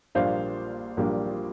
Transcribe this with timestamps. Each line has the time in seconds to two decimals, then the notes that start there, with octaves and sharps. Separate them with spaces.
0.15 A#1 A#2 G3 A#3 D4 C5 F5
0.97 A#1 A#2 G3 A#3 D4